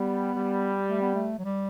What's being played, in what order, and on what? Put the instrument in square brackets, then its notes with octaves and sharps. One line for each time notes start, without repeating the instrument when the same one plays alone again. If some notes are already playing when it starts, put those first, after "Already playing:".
Already playing: [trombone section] G3 [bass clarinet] B3
[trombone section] G3
[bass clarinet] A3
B3
A3
F#3
G3